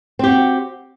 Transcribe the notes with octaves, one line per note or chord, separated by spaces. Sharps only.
C4 F#4 G4